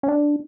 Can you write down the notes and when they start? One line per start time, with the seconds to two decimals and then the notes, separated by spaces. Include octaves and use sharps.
0.03 C#4
0.08 D4